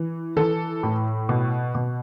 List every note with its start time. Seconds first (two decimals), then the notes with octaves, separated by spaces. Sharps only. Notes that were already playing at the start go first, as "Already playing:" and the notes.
Already playing: E3
0.36 E3 A4
0.83 A2
1.29 B2
1.75 B2